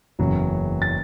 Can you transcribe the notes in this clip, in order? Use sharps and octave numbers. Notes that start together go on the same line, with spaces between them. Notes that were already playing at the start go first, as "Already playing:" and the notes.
F#1 E2 C#3 F#3
A6